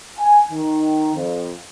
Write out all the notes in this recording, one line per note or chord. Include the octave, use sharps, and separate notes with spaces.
G#5
D#3
F2